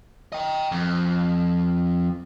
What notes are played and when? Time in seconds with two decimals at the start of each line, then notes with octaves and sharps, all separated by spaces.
0.32 D#5 G5
0.72 F2